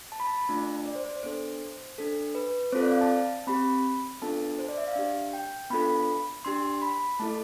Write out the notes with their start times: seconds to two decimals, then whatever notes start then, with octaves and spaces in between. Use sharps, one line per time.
0.12 A5
0.20 B5
0.27 A5
0.49 A3 D4 F4
0.86 D5
0.95 C5
1.06 C5
1.23 B3 D4 A4 C5
1.98 D4 A4
2.35 B4
2.72 C4 F4 A4 C5
2.83 D5
2.91 F5
3.01 A5
3.47 C4 G4 B5
4.22 B3 D4 F4 A4 A5
4.59 C5
4.69 D5
4.78 E5
4.87 F5
4.96 D4 G4
5.33 G5
5.70 B3 D4 F4 A4 B5
6.45 D4 G4 C6
6.82 B5
7.20 A3 E4 A4 A5